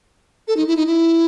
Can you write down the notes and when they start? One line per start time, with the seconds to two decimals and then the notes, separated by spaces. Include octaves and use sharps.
0.48 A4
0.57 D#4
0.68 E4
0.77 D#4
0.87 E4